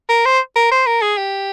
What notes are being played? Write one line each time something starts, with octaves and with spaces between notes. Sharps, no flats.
A#4
C5
A#4
C5
A#4
G#4
G4